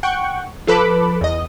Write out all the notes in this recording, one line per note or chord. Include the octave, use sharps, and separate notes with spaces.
F#5 G5 C#6
F3 A4 B4 B5 D6
E2 D#5